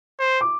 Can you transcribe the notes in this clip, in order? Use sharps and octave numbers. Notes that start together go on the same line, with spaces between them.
C5
D6